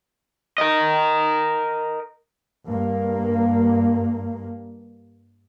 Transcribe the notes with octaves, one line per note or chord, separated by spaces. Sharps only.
A#4 D#5
G2 A#3